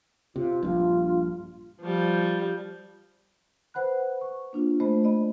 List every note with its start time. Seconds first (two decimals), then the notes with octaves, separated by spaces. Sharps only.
0.36 C3 F4
0.62 A#1 G2 F4
1.81 F3 G3
3.74 B4 C5 F#5 B5 F#6
4.21 C#6
4.53 A#3 D4 F4
4.80 A3 C5 D#5 B5
5.04 D5 D#5 B5